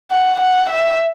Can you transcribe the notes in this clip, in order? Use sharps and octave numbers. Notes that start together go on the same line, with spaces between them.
F#5
F#5
E5